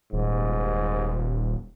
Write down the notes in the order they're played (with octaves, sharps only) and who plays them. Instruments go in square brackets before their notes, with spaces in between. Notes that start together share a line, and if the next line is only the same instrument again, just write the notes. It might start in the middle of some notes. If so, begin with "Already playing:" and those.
[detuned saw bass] D#1 [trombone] G#2